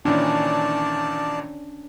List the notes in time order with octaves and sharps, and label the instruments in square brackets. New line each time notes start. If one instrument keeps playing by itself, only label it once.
[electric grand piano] A#2 D#3 E3 [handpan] C#4 D4 [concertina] D5 A5